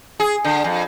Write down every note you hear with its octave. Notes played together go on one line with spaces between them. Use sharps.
G#4
D3
F2